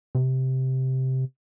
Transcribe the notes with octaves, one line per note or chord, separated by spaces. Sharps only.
C3